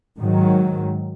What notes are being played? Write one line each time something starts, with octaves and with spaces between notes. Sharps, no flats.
G#2 D#3 F#3